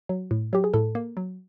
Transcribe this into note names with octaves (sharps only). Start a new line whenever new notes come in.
F#3
A2
F#3 G4
G#4
A2 A4
A#3
F#3